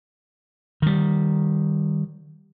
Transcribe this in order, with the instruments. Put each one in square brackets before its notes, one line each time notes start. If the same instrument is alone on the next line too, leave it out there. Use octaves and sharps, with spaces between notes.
[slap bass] D#3 G3